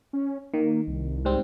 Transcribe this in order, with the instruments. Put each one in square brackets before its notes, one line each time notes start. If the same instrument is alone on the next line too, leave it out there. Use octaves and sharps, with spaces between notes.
[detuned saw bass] C#4
[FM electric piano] D#3 [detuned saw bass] A#3
[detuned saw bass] C2
[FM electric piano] G#2 G3 C4